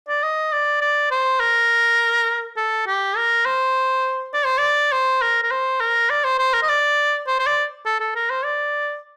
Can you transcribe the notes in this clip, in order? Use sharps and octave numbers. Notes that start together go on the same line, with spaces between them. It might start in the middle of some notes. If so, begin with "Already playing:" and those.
D5
D#5
D5
D5
C5
A#4
A4
G4
A#4
C5
D5
C5
D5
C5
A#4
A#4
C5
A#4
D5
C5
C5
A#4
D#5
D5
C5
C5
D5
A4
A4
A#4
C5
D5